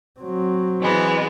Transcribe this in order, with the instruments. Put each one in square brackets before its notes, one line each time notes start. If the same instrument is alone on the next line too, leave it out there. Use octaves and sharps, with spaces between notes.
[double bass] F#3 C4
[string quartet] E3 G#3 B3